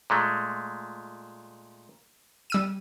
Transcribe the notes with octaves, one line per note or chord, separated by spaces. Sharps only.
A#2 G#3 A3
G3 E6 D#7